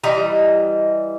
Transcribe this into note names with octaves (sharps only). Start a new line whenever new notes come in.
E3 G3 D#5 A#5